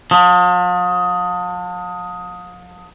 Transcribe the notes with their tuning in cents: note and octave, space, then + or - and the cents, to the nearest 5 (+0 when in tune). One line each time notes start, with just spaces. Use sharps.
F3 +40